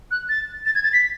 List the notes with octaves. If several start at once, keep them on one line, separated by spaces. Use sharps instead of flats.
F#6
A6
A6
G#6
A6
B6